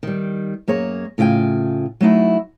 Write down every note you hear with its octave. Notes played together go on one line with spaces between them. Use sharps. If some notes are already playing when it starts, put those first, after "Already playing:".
D#3 G3
F#2 A#3 G#4 C#5
A2 C#3 F4 G5 G#5
F#3 A3 D#4 E4